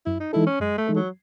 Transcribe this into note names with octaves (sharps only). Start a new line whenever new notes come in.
F#2 E4
D#4
E3 G#3 D#4 E4 A4
C#4
F#2 G#3
A3
E3 G#3 D#4 A4
F#3